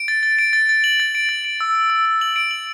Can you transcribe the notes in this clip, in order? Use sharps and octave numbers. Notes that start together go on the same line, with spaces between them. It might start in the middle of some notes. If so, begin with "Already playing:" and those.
Already playing: D7
A6
A6
D7
A6
A6
F#7
A6
D7
A6
D7
E6
E6
E6
E6
F#7
D7
F#7